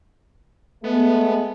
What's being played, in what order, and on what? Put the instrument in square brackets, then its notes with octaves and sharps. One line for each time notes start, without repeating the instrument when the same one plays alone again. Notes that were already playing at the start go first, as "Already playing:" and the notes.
[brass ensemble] G#3 A3 [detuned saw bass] B3